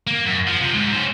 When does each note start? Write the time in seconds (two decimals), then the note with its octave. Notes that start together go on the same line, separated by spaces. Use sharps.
0.07 A#3
0.26 F#2
0.47 F3
0.61 C3
0.74 G#2
0.93 C#4 C5